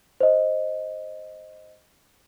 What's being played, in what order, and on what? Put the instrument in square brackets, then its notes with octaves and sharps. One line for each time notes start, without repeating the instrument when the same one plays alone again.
[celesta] C5 D#5